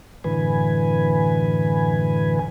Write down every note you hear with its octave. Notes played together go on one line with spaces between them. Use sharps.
F#2 A2 D3 E3 B4 G#5